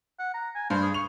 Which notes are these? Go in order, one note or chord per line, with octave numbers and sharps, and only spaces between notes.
F#5
A#5
G#5
G2 C5
G#4
C#6 F7